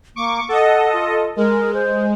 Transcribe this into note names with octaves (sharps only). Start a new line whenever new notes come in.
A#3 C#6 D6
A4 D#5 F#5
F4
G#3 A#4
C5